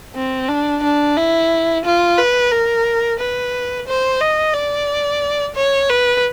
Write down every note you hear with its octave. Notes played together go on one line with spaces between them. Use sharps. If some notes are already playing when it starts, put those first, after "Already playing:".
C4
D4
D4
E4
F4
B4
A#4
B4
C5
D#5
D5
C#5
B4